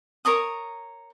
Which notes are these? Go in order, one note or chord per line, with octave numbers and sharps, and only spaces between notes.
A#4 C#5 A#5 D#6